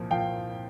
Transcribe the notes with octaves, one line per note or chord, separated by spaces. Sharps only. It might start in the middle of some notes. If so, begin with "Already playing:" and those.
Already playing: C2 A#2 F3
A#2 F3 F5 G5